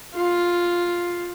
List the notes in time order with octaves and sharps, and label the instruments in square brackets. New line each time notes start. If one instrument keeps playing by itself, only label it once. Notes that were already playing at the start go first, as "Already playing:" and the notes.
[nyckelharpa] F4